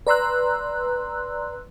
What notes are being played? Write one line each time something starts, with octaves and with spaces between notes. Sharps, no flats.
B4 D5 A#5 C6 E6 F#6